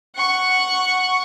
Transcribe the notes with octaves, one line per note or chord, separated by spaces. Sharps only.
F#5 C#6